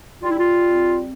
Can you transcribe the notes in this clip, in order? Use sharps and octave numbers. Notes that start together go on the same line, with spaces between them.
G3 F4
E4
F4
C4